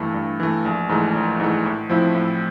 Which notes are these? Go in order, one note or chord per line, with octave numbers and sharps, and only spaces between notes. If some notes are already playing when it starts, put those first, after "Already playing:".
Already playing: G2 E3 A3
G2
E3 A3
A#1
G#2 E3 A3
A#1
G#2 E3 A3
A2
F3 A3 C4 E4
A2